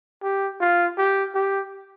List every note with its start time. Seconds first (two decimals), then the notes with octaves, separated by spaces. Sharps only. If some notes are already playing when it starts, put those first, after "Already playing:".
0.23 G4
0.61 F4
0.98 G4
1.35 G4